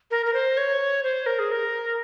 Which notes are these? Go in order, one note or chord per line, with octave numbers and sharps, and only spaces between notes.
A#4
A#4
C5
C#5
C5
A#4
G#4
A#4